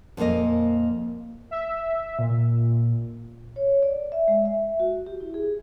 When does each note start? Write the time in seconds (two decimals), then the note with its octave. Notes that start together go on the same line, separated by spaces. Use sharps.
0.17 F2 A#2 E3 A#3 D#5
1.51 E5
2.19 A#2
3.56 C#5
3.82 D5
4.12 E5
4.28 G#3
4.45 E5
4.80 F#4
5.06 G4
5.20 E4
5.34 G#4